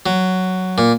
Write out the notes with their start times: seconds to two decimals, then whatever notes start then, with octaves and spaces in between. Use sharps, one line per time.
0.06 F#3
0.78 A#2